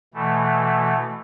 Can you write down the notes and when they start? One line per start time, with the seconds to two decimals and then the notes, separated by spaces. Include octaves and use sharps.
0.14 B2 E3 A3